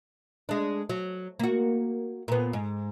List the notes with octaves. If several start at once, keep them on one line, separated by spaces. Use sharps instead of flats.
G#3 D4
F#3
A#3 F#4
A#2 B3
G#2